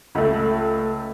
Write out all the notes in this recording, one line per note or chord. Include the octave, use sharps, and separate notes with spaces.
C#2 A3